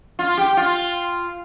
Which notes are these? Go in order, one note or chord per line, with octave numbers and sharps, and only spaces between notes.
F4
G4
F4